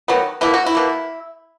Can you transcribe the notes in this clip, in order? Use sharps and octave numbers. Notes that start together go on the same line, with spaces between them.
D#3 F#3 B3
B2 A#3 E4
F#4
E4
B2 A#3